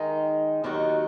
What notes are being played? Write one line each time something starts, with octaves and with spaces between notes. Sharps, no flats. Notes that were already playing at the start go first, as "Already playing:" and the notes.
Already playing: D#3 G#3 D#4
D#2 D#3 F#3 D#4 F#4